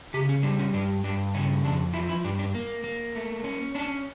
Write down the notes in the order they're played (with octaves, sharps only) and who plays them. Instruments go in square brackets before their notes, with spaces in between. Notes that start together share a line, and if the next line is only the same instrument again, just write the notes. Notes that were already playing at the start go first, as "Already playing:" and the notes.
[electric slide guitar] C#3 G4
C#4
G3 D4
C#4
G2 D4
G2 D4
C#3 C#4
F2 D4
F3 E4
E4
G2 D4
D4
A#3
A#3
A3
C#4
C#4 D4